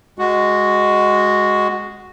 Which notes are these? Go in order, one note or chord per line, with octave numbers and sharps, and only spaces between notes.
G#3 F#4